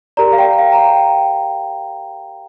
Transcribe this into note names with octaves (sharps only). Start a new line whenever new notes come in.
G4 A#4 D5 A#5
F5
G5
G5
F5
A#5
G5